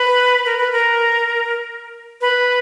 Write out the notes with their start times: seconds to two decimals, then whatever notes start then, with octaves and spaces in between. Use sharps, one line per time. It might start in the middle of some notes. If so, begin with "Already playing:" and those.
Already playing: B4
0.46 A#4
0.58 B4
0.72 A#4
2.21 B4